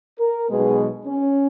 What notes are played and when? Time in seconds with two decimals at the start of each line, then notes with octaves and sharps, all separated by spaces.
0.19 A#4
0.48 B1 B2 G#3 B3 G#4
1.06 C#4